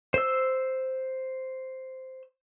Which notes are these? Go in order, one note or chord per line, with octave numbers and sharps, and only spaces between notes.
C5 E6